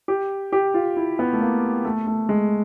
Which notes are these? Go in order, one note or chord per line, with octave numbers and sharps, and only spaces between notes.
G4
G4
F4
E4
B3
A3
A#3
A3
A3
G#3